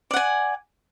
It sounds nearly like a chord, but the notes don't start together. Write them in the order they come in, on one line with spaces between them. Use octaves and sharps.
D5 F#5 G#5